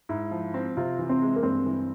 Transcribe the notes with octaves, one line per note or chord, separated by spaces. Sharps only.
G#2 E4
F3
C4
C3 F4
E3
C4
G#3
A#3
G2 C4
E3